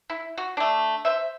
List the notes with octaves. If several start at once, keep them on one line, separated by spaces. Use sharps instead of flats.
E4
F#4
A3 D4
C5 E5